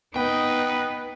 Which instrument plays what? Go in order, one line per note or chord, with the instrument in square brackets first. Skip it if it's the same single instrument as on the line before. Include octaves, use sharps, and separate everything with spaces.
[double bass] B3 [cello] D#4 [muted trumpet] B4 [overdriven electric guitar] G5